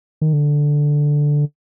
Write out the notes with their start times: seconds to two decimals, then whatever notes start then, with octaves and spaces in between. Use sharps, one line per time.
0.21 D#3
0.33 D3